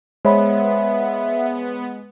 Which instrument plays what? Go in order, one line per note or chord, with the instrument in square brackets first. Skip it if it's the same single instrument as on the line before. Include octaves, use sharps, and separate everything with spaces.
[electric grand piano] G#3 [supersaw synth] B3 [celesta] C5 C#5 B5 [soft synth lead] E5